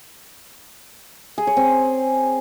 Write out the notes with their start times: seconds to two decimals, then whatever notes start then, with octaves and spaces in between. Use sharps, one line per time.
1.38 G#4
1.47 C#5
1.57 C4